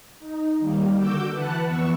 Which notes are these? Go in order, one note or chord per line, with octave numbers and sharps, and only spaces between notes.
D#4
D#3 G3 A#3
D3 F#4 D6 E6 G6
E3 B4 F#5 A5 F#6
F2 E3 B3 C#6 E6